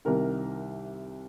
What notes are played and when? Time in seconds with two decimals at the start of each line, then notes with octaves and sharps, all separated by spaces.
0.05 C2 C3 D#3 A#4